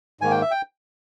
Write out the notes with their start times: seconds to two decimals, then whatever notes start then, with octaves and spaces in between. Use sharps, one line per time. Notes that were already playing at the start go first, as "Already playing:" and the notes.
0.21 G#2 D#3 A#3 G#5
0.31 G5
0.42 E5
0.51 G5